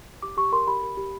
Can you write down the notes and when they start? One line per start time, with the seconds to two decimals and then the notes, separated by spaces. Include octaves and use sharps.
0.22 G4 D6
0.37 G4 C#6
0.52 A#4 C6
0.67 G4 B5
0.83 A#4
0.97 G4